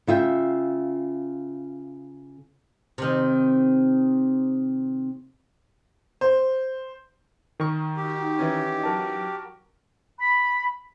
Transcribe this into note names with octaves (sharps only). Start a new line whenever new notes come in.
C#3 F4 E5 G5
C3 D#3
C5
D#3 A#4 C#6
D#4 F#4 G4
E3 C#4
F#3 F#4 A#4 A5
B5